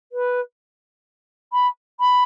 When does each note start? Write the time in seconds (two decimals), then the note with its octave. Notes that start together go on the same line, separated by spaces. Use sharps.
0.12 B4
1.53 B5
2.00 B5